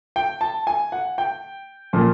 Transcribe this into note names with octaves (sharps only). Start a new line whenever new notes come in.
G5
A5
G#5
F#5
G5
A#2 F3 A#3